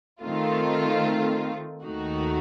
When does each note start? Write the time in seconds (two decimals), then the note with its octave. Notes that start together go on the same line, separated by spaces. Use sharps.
0.22 D#3 A3 C4 F4
1.84 D#2 D#3 A3 D#4 F#4